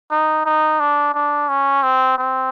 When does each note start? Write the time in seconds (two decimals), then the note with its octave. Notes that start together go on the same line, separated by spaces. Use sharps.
0.11 D#4
0.46 D#4
0.80 D4
1.14 D4
1.49 C#4
1.83 C4
2.18 C4